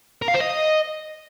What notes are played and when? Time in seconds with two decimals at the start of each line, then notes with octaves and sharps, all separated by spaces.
0.22 A#4
0.28 F5
0.34 C5
0.40 D#5